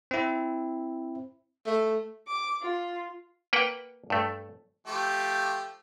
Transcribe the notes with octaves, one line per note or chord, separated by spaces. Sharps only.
C4 E4
A3
D6
F4
A#3 B4 F#5 G5
G2 A3
F3 A3 G4